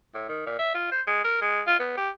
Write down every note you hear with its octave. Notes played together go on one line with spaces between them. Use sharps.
A2
D#3
A#2
E5
F4
C5
G#3
A#4
G#3
F4
B3
G4